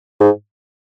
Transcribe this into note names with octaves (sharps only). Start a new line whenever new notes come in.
G#2